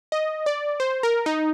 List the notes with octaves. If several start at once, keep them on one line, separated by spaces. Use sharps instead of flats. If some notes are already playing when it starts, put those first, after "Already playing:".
D#5
D5
C5
A#4
D#4